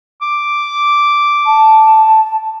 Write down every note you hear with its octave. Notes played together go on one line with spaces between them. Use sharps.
D6
A5